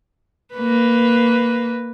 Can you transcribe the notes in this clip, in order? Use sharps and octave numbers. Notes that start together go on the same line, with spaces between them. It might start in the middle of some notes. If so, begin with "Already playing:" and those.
A#3 B4